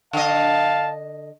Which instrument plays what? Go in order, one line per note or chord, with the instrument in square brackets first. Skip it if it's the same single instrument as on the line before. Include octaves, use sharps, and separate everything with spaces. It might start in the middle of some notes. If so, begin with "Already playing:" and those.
[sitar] D3 D#5 [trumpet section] F5 A5